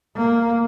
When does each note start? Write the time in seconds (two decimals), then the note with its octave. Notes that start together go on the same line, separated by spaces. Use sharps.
0.16 A#3